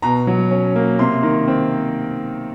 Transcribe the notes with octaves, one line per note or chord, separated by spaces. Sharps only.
B2 A#5
F#3
C#4
A#3
C3 C6
D#3
C4